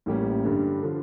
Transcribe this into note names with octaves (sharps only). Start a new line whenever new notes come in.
A1 A2 G3 A#3 C#4
G2 D3 G3 D4
D3 F3